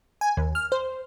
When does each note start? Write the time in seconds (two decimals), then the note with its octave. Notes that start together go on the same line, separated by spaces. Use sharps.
0.21 G#5
0.37 D#2
0.55 F6
0.72 C5